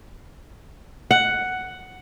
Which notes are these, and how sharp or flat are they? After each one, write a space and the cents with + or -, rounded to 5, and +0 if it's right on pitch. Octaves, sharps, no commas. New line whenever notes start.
F#5 +5